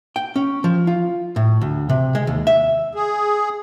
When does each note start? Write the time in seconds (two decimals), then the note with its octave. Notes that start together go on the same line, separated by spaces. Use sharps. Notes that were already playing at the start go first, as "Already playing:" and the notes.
0.16 G5
0.36 C#4
0.64 F3
0.87 F4
1.36 A2
1.61 D2
1.89 C3
2.15 G#3
2.27 D#2
2.47 E5
2.95 G#4